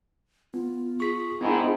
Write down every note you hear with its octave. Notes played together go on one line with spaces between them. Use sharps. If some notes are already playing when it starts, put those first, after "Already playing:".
B3 F4
G#4 C#6 B6
G#2 D#3 B3 D4 E4